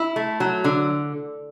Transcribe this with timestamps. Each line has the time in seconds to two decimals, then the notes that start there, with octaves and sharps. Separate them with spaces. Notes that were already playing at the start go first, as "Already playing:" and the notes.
Already playing: E4
0.16 A3
0.40 F#3
0.64 D3